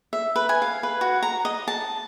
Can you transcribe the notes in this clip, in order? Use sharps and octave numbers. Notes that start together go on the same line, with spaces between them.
E5
B4
G#5
F5
B4
F#4
A#5
D#5
A5